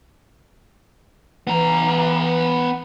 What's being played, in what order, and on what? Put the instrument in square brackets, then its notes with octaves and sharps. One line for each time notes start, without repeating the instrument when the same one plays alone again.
[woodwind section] E3 [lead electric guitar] B3 A#5